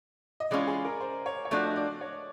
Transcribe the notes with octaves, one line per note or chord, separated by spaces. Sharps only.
D#5
E3 G#3 C#4 F4 D5
G#4
A#4
C5
C#5
C#5
F3 A3 D4 F#4 D5
D#5
D5
C#5